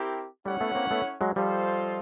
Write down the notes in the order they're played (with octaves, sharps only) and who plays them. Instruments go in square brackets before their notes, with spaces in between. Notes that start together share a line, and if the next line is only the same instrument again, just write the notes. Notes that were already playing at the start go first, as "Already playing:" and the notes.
Already playing: [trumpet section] C4 E4 G4 A#4
[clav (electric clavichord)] G3 A3 [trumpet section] C#4 E4 A4 C#5 F#5
[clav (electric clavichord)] A3 B3
A#3 C4
A3 B3
F#3 G#3
[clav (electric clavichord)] F3 G3 [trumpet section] F4 A4 C5 D#5